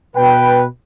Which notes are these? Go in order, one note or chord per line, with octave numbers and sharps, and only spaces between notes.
B2 B4 G5